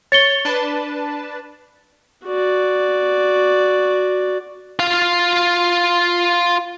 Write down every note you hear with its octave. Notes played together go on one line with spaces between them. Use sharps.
C#5 A6 C#7 G7
D4 B4 A5
F#4 D5
F4 F5